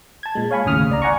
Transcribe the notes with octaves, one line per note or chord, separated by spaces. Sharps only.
A5 G#6
A#2 G#3
C#5 F5 G#5 B5 C#6
G1 D#2 A2 C#3 D#6 F6
C#2 D5 A#5
D5 F#5 G#5 A#5 C#6